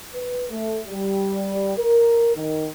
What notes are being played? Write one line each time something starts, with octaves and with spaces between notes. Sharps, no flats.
B4
A3
G3
A#4
D#3